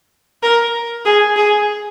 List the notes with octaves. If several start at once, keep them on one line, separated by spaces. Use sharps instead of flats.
A#4
G#4
G#4